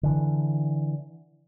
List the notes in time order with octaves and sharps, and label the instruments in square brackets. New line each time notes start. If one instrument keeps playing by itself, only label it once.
[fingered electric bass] D3 E3